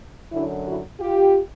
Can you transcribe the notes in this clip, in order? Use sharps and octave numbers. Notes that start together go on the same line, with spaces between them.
F#2 D3 F#3 D4 E4
E4 F#4
F4 G4